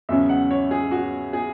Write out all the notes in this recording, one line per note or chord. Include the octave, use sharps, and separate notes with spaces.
E2 C#3 F#3 C#4 E5
F#5
C#5
G#4
F#4
G#4